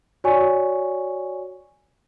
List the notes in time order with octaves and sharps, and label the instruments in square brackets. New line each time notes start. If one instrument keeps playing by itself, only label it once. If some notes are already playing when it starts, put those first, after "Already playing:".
[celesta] F#4 C#5 D5 G#5 C#6